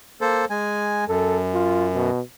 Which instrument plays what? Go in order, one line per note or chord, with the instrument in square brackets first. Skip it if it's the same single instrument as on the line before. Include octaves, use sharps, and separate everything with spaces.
[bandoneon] A#3 A4 C5
G#3 G#5
[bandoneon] F#2 [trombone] A4
[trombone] F4
B2